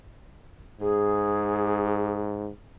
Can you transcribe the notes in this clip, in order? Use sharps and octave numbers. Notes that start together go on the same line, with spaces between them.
G#2 G#4